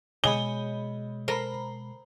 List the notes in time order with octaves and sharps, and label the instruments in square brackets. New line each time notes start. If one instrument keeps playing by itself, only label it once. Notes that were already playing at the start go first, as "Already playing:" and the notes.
[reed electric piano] B2 G#3 [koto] G#4 [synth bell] C#5 D#5 B5 [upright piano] G7
[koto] A4 A#4 [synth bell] C5 A#5 B5